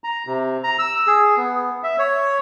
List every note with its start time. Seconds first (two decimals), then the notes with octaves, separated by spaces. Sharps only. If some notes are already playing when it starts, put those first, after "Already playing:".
0.04 A#5
0.27 C3
0.64 A#5
0.79 E6
1.07 G#4
1.37 B3
1.83 E5
1.99 C#5